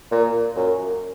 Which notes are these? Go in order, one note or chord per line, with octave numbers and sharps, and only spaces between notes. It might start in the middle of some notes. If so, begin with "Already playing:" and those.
A#2
F#2